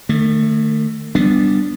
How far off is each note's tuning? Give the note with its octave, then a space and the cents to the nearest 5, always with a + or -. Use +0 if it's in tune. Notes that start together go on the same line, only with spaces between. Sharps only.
D#3 -40 A3 +10
G3 -10 B3 +0 D4 +0